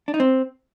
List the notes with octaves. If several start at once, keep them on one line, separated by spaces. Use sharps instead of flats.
D4
D#4
C4